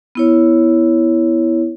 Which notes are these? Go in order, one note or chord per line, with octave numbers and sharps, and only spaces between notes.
B3 E4 C#5